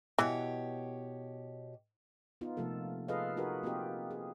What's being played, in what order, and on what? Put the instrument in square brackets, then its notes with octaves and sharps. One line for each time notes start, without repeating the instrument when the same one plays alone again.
[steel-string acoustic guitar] B2 G4 C#5 [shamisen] E3
[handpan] B3 D#4 F4
C3 F3 A3 A#3 A4
F4 G#4 A4 B4 D#5 F5
D#4 F#4 G#4 A#4 B4
A#3 C4 F4 G4 D#5
G#4